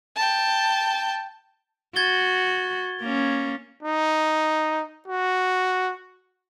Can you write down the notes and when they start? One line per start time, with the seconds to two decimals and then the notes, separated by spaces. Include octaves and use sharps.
0.16 G5 A5
1.96 F#4 G#6 A6 G7
3.01 A#3 C#4
3.83 D#4
5.08 F#4